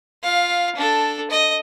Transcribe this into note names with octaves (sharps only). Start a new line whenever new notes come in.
F4 F5
D4 A4
D#5